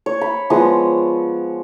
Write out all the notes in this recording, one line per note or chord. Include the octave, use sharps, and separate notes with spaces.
C#5
B5
F3 G#3 B3 D#6